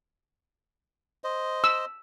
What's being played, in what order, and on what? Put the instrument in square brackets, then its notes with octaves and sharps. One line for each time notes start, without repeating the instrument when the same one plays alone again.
[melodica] C5 D#5
[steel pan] E6